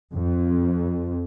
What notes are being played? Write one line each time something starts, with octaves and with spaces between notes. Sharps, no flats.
F2